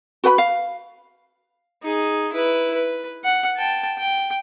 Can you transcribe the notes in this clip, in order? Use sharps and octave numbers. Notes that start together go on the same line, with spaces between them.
F#4 B4 G5 B5
F5
D#4 G#4
E4 B4
B4
F#5
G5 A5
G5